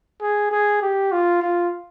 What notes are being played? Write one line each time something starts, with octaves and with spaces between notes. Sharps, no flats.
G#4
G#4
G4
F4
F4